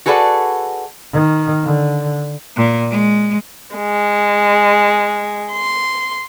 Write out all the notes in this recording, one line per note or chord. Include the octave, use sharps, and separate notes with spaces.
F#4 G#4 A4 B4 D5 F#5
D#3
D3
A#2
G#3
G#3
C6